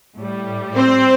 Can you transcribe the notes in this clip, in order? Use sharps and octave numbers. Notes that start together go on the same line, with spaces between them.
A2 G3
C4 C5